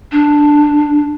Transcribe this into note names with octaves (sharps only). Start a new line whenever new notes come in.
D4